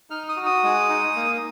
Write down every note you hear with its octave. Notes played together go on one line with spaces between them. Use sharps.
D#4 F6
D#6
F#4
D#6
G#3
D#4
A#3